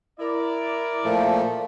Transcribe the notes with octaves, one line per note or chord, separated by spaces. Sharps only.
E4 A#4 D5
A#2 F3 A3